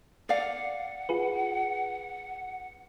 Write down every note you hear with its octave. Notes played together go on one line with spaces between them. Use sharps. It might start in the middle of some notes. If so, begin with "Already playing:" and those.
D5 F5 F#5
F4 G#4 B4